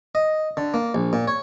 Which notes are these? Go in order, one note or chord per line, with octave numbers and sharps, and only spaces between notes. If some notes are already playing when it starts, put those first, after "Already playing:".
D#5
D3
A#3
A#1
A#2
C#5